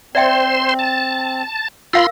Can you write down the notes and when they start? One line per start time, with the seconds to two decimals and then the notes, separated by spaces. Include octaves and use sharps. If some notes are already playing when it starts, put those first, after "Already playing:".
0.15 C4 C5 D5 E5 G5 C6
0.79 A5
1.93 F4 A#4 F5 B5 C6 E6